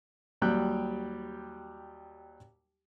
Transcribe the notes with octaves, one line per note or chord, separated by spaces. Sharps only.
D#2 F#3 G3 G5 F#6